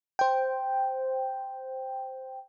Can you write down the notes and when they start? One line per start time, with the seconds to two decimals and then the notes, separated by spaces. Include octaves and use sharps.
0.19 C5 G5